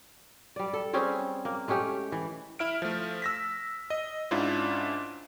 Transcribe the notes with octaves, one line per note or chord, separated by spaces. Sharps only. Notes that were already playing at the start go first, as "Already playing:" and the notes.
G3 D5
A4
G3 C4 C#4 G#4
A#3
G#3 A3 C#4 G4
E3
E4 E5 F6 D7
F3 A3
E6 A#6 B6
D#5
G#2 C#4 D4 E4 F4